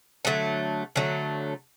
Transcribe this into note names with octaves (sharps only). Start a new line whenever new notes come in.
D3 F#3 A3
D3 F#3 A3